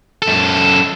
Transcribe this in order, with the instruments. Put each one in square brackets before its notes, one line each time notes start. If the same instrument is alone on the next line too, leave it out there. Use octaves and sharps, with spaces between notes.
[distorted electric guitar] F#2 A4